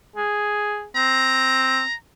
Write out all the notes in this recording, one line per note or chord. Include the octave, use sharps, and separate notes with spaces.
G#4
C4 A#5